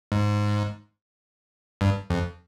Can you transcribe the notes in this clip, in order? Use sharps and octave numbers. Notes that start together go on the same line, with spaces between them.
G#2
G2
F2